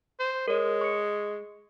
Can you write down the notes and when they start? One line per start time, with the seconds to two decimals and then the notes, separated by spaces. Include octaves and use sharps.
0.20 C5
0.48 G#3 A#4 C#5
0.81 C#6 C#7